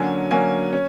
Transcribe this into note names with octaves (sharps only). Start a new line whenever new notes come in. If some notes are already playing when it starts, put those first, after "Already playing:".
Already playing: D3 F#3 A#3 C#4 G#5
D3 F#3 A#3 C#4 G#5
C#4